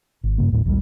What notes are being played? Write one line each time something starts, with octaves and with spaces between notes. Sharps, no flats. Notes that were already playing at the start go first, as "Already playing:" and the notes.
G#1
G2 C#3 A#3
D#2 A2
A#1 D#2 F3 G3